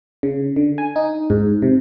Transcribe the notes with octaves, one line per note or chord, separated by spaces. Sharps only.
C#3
D3
G#5
D#4
G#2
C3